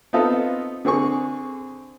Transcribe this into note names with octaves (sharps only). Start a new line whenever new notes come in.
B3 C4 D#4 F4 A4
D3 C4 G#4 C#6